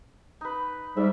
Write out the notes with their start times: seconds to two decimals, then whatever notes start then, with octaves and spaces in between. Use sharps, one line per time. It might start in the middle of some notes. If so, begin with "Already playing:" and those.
0.41 D#4 B4
0.97 G#2 G3 E5